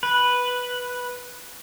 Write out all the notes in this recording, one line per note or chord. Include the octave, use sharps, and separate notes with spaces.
B4